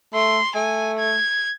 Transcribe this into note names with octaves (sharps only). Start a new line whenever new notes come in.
A3 C6
A3 G#5
G#6